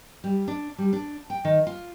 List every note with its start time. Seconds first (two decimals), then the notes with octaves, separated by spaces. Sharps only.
0.24 G3
0.48 D4
0.78 G3
0.93 D4
1.30 G5
1.45 D#3
1.67 F4